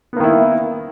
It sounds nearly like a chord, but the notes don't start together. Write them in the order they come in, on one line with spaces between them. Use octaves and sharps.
B3 A#3 D#3 E4